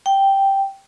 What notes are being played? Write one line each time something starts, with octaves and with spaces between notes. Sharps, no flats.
G5